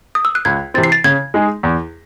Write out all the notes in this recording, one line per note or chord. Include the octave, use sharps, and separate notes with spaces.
D#6
E6
F#6
C#2 G#6
C3 E3 C4 A6
C7
A6
C#3 G#6
G#3 D#4 G#4
E2